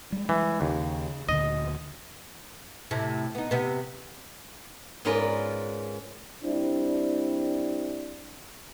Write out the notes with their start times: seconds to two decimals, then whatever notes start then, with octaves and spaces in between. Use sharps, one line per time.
0.12 G3 G#3
0.29 E3
0.61 D#2 C#3
1.29 D2 A#2 D3 D#5
2.91 A2 C3
3.35 B3 D#4
3.51 C3 B3
5.05 G#2 B3 C#4 F4 A#4 D5
6.44 G3 C4 D4 E4